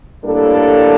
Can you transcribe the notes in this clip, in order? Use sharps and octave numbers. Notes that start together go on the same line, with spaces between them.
A2 G3 A#3 D4 A4